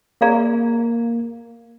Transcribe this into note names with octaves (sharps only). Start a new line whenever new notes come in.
A#3 G#4 D5 F5 A#5